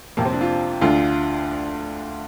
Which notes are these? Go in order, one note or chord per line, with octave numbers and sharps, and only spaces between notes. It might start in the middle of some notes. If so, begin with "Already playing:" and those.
F2 C3 A#3
C4
D4
F4
D2 D3 F4